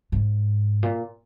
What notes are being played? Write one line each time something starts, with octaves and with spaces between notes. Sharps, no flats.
G#2
A#2